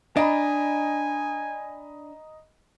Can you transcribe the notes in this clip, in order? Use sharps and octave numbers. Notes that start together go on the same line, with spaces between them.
D4 D#5 G#5 A#5 B5